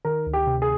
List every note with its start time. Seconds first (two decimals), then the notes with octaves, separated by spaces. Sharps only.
0.05 D#3 A#4
0.26 D2
0.33 G4
0.47 C3
0.62 G#4